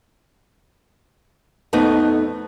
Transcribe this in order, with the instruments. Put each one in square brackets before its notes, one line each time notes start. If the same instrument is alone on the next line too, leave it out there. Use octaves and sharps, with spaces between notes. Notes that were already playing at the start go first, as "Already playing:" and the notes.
[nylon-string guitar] F2 A3 B3 D#4